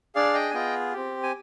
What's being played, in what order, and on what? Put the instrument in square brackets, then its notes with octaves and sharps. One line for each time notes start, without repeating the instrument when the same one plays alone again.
[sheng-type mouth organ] D4 G#4 D5 F5
D#5 G5
G#5
B3 F4 G#4 D#5 G5
C4 G4
G#5